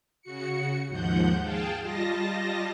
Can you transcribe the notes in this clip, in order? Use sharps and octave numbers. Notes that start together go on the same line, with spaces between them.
C#3 F#4 C#7
D#2 G#2 F3 F#5 G6
G#4 F5 G5 A5
G3 F4 D#5 A5 A#6